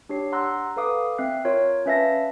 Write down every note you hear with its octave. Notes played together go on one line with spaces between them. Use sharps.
D4 G4 C#5 C7
F#5 A#5 C6 E6 F#6
A4 B4 F5 D6 D#6
C4 E5 F#6 C7
F4 A#4 C#5
C#4 B4 E5 F5 A5 A#6